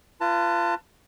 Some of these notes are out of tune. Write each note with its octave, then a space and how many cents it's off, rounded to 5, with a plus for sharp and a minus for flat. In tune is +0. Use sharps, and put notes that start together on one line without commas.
F4 -25 B4 +0 A5 +25